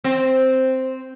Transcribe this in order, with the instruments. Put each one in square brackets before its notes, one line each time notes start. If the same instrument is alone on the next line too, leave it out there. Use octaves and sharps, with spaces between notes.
[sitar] C4